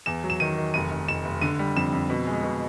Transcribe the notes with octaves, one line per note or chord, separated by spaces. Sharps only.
E2 E7
F#3
E7
D#3 D#7
D#3
F1 D#7
F1
F1 E7
F1
D3 D#7
G3
F2 E7
F2
B2
G#3
B2